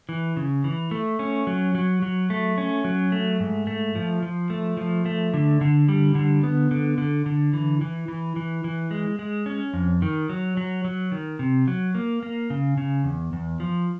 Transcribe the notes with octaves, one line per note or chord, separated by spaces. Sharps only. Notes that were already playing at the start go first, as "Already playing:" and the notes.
E3
C#3
E3
A3
C#4
F#3
F#3
F#3
A3
C#4
F#3
A3
G#2
A3
F3
F3
A3
F3
A3
D3
D3
G3
D3
B3
D3
D3
D3
E3
E3
E3
E3
E3
G#3
G#3
C#4
F2
D#3
F#3
F#3
F#3
D#3
C3
F#3
A#3
A#3
C#3
C#3
E2
E2
F3